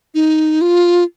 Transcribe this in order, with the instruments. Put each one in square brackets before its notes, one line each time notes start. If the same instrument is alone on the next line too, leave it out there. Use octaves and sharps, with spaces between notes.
[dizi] D#4
F4